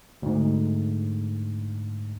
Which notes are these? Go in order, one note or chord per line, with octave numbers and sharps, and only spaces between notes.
D2 G#2